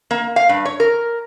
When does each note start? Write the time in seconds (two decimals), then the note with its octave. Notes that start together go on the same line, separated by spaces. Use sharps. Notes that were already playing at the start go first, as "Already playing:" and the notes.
0.11 A#3
0.36 F5
0.49 G2
0.65 C#5
0.80 A#4